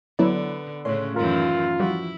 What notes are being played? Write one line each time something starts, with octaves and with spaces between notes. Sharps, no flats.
D3 F#3 B3 E4 D5
A2 C#3 A3 C#4 C6 F#6
F#2 D#3 E3 F4 A#4
F3 G3 E4 F#4